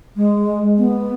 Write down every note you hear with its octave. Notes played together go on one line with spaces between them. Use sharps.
G#3
B3